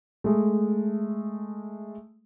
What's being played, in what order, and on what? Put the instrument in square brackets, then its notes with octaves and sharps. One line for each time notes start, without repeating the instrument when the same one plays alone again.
[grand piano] G#3 A3